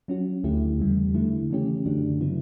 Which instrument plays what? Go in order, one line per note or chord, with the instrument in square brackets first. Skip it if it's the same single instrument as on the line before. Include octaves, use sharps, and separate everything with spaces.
[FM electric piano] F#3 C#4 F#4
D2 D3 A3 E4 G4
E2 C#3 E3 G3
D3 A3 E4
C#3 E3 A3 C#4 G4
F#2 D3 A3 D4 F#4
C#3 F#3 B3 E4